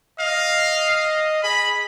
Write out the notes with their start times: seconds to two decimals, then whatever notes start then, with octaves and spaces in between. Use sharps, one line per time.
0.20 D#5 F5
1.44 G#4 B5